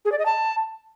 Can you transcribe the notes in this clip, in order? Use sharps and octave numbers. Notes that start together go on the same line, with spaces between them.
G#4
D5
D#5
A5